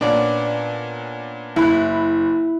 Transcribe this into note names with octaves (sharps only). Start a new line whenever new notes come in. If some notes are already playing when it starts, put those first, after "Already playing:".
A#2 B3 C#4 D4 D5
F#1 E4 B5 F#6